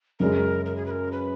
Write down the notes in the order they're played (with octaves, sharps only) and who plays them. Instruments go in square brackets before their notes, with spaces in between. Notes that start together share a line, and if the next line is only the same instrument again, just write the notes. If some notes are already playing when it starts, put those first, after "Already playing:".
[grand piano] F#2 C#3 G#3 [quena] A#4
[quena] A#4
G#4
B4
A#4
B4